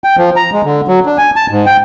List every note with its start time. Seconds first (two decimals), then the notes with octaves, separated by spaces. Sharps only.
0.04 G5
0.18 F3
0.36 A#5
0.52 G#3
0.64 D3
0.88 F#3
1.06 D4
1.18 G#5
1.36 A5
1.51 G#2
1.66 G5